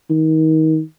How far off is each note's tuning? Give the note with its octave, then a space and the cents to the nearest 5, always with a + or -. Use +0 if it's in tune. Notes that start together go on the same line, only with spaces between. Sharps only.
D#3 +30